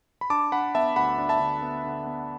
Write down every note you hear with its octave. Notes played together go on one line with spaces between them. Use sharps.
B5
D4 A5 D6
D4 F#5 B5
B3 E5 A5
D2 F#5 B5
D4
E5 A5
D3
B3
D3
B3